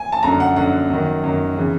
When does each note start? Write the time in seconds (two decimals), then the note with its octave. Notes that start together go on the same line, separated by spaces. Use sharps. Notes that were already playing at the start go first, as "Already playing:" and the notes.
Already playing: G#5
0.12 A5
0.23 F#2 D3 A#5
0.40 F#5
0.56 F#2 D3 F#5
0.90 F#2 D#3
1.24 F#2 D#3
1.57 C#3 E3